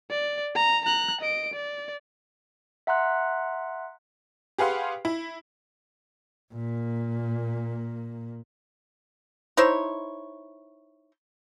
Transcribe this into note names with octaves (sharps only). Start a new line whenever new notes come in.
D5
A#5
A#5 F#6
D#5 D7
D5
E5 F#5 A#5 C6 F#6
G4 G#4 B4 F5 F#5 C6
E4
A#2 A#3
D#4 E4 C5 C#5